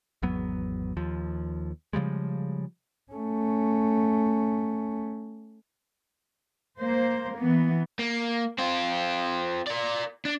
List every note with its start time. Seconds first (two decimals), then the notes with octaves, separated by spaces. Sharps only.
0.22 G#1 E2 F#3 B3
0.97 D#2 F3
1.93 C#3 F3 G3 G#3
3.13 A3 C#4
6.79 A#3 C5
7.39 E3 B3
7.99 A#3
8.59 C4 F4
9.67 A#4 D5
10.25 D4